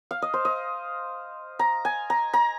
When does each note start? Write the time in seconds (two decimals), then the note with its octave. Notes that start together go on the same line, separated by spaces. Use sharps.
0.11 F5
0.22 D#5
0.34 C5
0.45 D#5
1.59 A#5
1.85 G#5
2.10 A#5
2.33 A#5